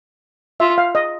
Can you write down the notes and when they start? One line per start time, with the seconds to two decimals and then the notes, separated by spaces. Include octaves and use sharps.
0.60 F4 E5
0.78 F5
0.95 D#5